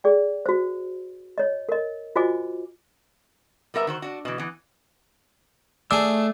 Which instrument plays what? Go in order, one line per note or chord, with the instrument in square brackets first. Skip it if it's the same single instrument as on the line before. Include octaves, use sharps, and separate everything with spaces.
[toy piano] G#4 D5 G5
F#4 C5
C#5 D#5
A#4 D#5
F4 F#4 C5 D#5 G#5 D6
[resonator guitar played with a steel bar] G3 B3 A#4 E5
D#3 F#4 C5
D4 F#4
B2 E3
E3 B3
[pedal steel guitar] A3 E6 [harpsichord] D4 G#4